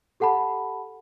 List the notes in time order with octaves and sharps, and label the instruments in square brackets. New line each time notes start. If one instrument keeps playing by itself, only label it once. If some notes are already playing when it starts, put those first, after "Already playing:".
[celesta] G4 A4 F#5 A5 B5